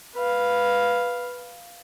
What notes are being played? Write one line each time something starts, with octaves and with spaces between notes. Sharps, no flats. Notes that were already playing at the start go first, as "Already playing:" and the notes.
B4 F5